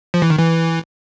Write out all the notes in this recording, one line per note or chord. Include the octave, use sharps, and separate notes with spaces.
F3
E3
D#3
E3